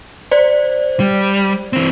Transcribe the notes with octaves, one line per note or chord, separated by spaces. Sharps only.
C5 D5
G3
E3 C4